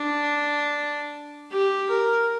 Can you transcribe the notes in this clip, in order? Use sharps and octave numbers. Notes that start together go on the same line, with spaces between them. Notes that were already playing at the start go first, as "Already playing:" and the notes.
Already playing: D4
G4
A#4